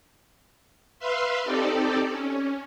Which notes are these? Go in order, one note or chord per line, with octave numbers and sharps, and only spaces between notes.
B4 E5 F5 C6
C4 D#4 G4 A4 D5
C#4